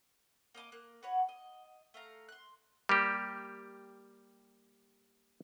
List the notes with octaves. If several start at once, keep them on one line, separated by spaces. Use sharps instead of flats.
A#3 D#5 A#5 D6
A#3 F#6
F#4 B4 C#5 F#5
D#5
A3 F5 A#5
C6 F#6
G3 A#3 G4